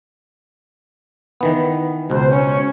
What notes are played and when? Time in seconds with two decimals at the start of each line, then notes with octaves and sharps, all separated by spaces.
1.41 D#3 E3 B3
2.10 C#2 B2 C5
2.30 C#4